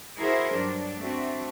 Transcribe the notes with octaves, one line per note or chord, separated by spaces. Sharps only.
E4 F#4 G#4 A#4 C5
G2 F#3 D4
A3 C4 D4 F#4